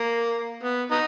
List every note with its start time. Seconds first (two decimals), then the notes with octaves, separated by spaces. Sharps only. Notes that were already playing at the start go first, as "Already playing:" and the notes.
Already playing: A#3
0.63 B3
0.91 B3 D#4